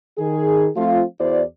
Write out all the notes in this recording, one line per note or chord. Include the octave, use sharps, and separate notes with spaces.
D#3 G#4
F3 A3 C4 F4
E2 E4 F#4 C5 D5